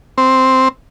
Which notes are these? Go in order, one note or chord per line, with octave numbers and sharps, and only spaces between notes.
C4